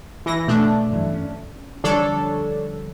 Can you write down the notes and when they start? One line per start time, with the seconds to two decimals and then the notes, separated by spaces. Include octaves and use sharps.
0.26 E3 A#6
0.48 B2 A3 D4
0.91 G2 E3 F#3
1.13 C#4
1.84 D3 F3 G3 D4 A4 C#5